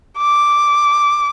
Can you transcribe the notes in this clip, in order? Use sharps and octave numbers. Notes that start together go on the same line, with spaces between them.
D6